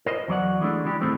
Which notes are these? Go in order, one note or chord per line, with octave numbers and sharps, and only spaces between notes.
A#4 C5 D#5
E2 F#3 D5 F#5
E3 G#3 A3 D4
E3 G#3 D4 G4
D#2 A2 G#3 A3 C4